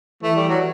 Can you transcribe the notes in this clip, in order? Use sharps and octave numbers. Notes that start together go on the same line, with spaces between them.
E3 A3
G3
F#3